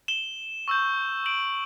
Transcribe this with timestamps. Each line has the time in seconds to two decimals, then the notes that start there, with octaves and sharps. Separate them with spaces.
0.08 E7 G7
0.68 C#6 E6 G6
1.26 D7 F#7